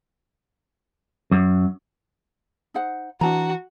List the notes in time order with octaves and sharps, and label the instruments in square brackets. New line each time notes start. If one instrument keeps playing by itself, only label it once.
[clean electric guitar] F#2
[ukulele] D#4 C5 F#5
[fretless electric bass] E3 [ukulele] D4 A5 A#5 [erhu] F#4